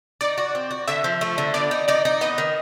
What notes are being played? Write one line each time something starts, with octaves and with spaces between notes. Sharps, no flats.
D#4 D5
F#4
C4
F#4
D3 E5
F3
A3
D3
B3 D5
D#4
D#4 D5
D#4
B3 D#5
D#3